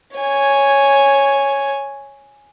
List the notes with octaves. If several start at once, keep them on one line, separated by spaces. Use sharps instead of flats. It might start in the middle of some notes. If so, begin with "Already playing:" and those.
C#5 G#5